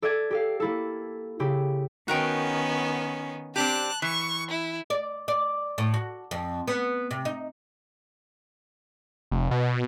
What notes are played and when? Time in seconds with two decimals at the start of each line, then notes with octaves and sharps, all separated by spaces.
0.02 A4 D5 E5 D6 G#6
0.31 G4 A4 F5
0.60 A#3 E4 A4
1.39 C#3 E4 G4
2.08 D#3 B3 C#4 F#4 A#4 G5
3.56 C4 D4 G4 A5 F#6
4.02 E3 C#6
4.51 E4
4.90 D5
5.28 D5
5.78 A2
5.94 F#4
6.31 F2
6.68 B3
7.11 C3
7.25 D#4
9.31 F1
9.51 B2